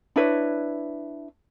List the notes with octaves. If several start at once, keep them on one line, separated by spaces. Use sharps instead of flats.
D4 E4 B4 C#5